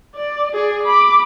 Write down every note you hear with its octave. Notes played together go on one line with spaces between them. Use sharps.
D5
G#4 D5
B5 D6